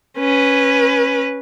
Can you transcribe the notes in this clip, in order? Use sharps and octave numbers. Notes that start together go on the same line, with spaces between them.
C#4 B4